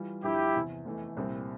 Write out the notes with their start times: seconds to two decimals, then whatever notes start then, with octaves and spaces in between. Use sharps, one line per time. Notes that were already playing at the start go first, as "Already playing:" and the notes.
Already playing: E3 G3 F4
0.23 G2 D3 F3 E4 G4
0.54 E2 C3 E3
0.86 F1 E2 E3 A3
1.17 C2 A#2 G3 C4